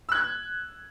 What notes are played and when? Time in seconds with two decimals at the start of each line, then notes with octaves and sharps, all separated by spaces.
0.09 E6
0.12 F#6
0.15 G#6